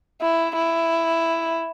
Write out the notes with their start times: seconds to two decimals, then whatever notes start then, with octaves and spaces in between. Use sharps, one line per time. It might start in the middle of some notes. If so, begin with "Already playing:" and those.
0.22 E4
0.55 E4